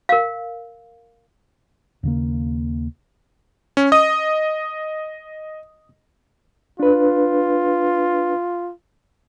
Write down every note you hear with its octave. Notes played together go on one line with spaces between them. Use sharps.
A#4 F5
D#2 C#3 A#3
C#4
D#5 D#6
D4 F4 B4